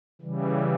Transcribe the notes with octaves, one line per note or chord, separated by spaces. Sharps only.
C#3 E3 G3